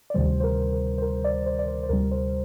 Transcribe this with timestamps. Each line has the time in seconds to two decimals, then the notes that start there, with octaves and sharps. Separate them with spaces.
0.10 D5
0.14 D2 C3 D#3 G3 C5
0.40 C5
0.44 A#4
0.73 A#4
0.98 C5
1.02 A#4
1.24 D5
1.46 C5
1.59 D5
1.68 C5
1.83 C5
1.89 D2 C3 G3 A#4
2.12 C5